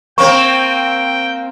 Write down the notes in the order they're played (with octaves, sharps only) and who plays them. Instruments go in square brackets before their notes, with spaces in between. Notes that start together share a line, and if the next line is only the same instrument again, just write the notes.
[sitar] A#3 C4 [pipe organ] G5 [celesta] C#6